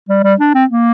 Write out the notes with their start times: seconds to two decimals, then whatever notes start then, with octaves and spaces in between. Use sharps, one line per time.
0.09 G3
0.23 G3
0.39 D4
0.54 C4
0.70 A#3